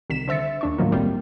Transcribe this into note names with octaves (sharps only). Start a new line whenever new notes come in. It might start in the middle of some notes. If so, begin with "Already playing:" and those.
C2 D#3 B6 E7
D3 C5 E5 A6 C#7
D#2 D4 C#6
A2 D#3 F3 F#3 A#3
G1 C2 G3 A#3 C4